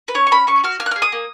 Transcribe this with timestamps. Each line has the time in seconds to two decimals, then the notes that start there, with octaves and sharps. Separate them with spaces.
0.08 B4
0.14 C#4 C#5
0.27 C#6
0.31 C#4 B5
0.47 C#4 C#6
0.64 F#4 F6
0.80 A#3 F6
0.86 F#6
0.91 G#4 F6
1.02 D#6
1.12 A#3